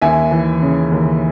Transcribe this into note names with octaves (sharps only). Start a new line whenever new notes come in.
D#2 E5 G#5
E3
C#3
D#2